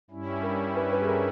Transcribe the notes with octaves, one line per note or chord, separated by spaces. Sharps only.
G2 G3 C#4 E4
A#4
B4
B4
G#4
A#4